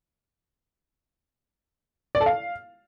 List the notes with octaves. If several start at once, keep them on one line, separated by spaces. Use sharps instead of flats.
D5
A4
F5